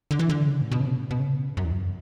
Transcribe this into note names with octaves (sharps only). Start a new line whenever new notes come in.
D3
E3
D3
C#3
A2
B2
C#3
B2
A2
B2
C#3
F#2
E2
F#2